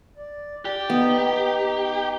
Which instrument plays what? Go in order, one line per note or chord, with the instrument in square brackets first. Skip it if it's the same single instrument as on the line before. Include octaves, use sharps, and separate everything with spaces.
[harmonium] D5
[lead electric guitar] G4 [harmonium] D5
[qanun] B3 [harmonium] D#4